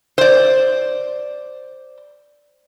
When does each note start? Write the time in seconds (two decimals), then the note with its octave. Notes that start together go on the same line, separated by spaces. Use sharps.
0.18 C5 D5